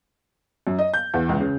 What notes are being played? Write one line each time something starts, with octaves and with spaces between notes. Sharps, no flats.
F#2
D#5
G6
E2
C#2
C#3